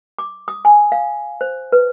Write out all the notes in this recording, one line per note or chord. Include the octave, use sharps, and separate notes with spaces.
D6
D#6
G#5
F5
C5
B4